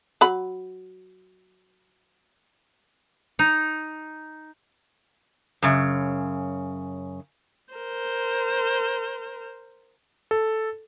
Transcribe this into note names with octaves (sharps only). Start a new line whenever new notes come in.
F#3 B5
D#4
F#2 C#3
A#4 C5
A4